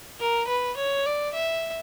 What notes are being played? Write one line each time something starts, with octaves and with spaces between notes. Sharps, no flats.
A#4
B4
C#5
D5
E5